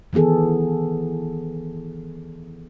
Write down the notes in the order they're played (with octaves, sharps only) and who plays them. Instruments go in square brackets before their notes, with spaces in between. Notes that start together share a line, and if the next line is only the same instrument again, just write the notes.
[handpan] D#3 E3 B3 G#4 A4